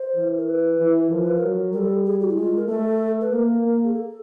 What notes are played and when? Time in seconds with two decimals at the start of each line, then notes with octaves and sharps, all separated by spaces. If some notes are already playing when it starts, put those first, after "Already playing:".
Already playing: C5
0.15 E3
0.37 A#4
0.47 B4
0.78 E3
1.10 F3 A#4
1.22 B4
1.36 A#4
1.41 F#3
1.73 G3 A#4
1.78 A4
2.05 G#4
2.21 F#4
2.28 E4
2.36 G#3 F4
2.56 A#4
2.67 A3 A4
3.21 B4
3.31 A#3 A#4
3.62 A#3
3.84 G#4
3.94 A4